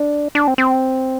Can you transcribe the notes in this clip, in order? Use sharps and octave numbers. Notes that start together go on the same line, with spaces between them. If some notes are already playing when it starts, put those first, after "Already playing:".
Already playing: D4
D4
C4
C4